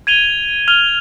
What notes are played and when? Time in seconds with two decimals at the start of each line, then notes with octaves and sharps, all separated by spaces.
0.07 G#6 D#7 F7 G7
0.68 F6 F7 G7